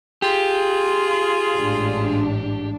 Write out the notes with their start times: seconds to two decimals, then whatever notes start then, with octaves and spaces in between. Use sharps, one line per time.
0.22 F4 G4 G#4
1.55 A1 G#2 D4